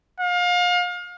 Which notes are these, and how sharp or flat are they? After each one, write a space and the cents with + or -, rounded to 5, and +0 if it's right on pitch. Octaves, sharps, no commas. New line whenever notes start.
F5 +30